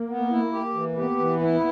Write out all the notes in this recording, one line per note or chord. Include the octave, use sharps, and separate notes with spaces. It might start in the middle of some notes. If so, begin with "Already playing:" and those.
Already playing: A#3
B3
E4
G4
E3
B3 G4
E3
E4